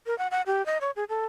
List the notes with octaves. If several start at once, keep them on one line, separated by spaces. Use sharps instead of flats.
A#4
F#5
F#5
G4
D#5
C#5
G#4
A4